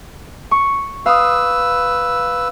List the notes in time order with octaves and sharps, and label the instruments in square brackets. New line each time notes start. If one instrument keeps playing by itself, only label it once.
[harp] C#6
[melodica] B4 E6 [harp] F5 D#6